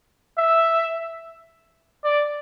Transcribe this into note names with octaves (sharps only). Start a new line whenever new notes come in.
E5
D5